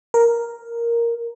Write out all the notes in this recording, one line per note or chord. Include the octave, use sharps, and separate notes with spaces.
A#4